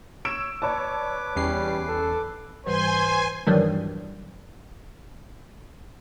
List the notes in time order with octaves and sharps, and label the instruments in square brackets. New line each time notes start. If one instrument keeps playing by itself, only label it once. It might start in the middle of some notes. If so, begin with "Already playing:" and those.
[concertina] C#5 [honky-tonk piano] E6 D7 E7
[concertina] B4 D6 [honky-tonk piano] C#5 D5 A5
[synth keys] E2 C#4 C7 [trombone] G3
[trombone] A4
[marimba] G#2 E3 G3 [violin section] B4 C6 [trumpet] C5 [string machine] G#5
[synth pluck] G2 D#3 E3 F#3 G3